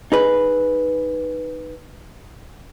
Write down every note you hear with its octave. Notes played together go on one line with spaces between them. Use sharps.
D#4 G#4 B4